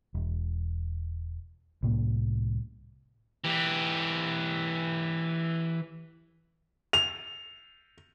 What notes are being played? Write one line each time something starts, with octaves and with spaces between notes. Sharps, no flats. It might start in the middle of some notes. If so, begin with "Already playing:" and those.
E1
C2 A2 A#3
E3 G4
F7